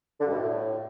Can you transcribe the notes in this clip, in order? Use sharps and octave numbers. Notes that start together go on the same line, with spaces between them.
D3
G2
B2
A2